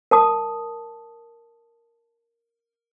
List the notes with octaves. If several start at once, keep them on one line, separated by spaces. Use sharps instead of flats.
A#4 A5 D#6